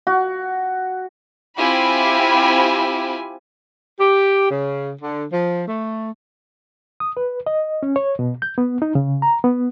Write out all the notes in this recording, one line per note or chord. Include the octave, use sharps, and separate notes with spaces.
F#4
C4 E4 F4 G4 G#5 B5
G4
C#3
D3
F3
A3
D#6
B4
D#5
C#4
C#5
B2
G6
B3
D#4
C#3
A#5
B3